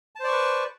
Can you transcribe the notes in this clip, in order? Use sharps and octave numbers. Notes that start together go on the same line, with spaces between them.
B4 C5 D5 A5 C#6